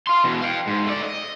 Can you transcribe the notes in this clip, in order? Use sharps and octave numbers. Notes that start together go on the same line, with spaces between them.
F5 C6
B2 E3
F5 G5
G#2
A3 D5
D#5